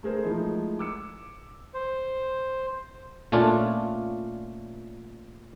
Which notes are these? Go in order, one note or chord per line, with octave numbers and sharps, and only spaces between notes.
A3 G#4 A#4 C5
F3 G#3 A3 D#4 E4
D6 E6 C#7
C5
A#2 A3 C#4 D4 F4